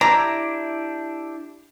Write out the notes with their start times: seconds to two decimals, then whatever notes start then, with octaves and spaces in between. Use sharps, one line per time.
0.01 D4 E4 G4 A#5